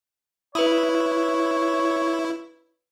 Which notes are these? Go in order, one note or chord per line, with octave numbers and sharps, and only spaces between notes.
E4 B4 C#5 B5 D#6